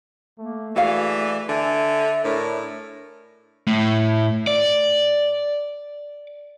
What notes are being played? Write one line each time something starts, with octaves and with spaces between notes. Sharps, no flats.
A3 A#3
E3 F#4 G#4 D5 F5
D3 E5 G#5
A2 D4 A#4
A2
D5